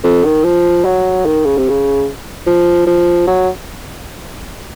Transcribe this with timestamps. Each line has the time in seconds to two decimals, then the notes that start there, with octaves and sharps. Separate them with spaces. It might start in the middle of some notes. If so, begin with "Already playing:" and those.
0.04 F2
0.24 D#3
0.44 F3
0.85 F#3
1.25 D#3
1.45 C#3
1.57 C3
1.69 C#3
2.46 F3
2.87 F3
3.27 F#3